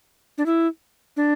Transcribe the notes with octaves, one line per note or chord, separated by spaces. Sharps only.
D4
E4
D4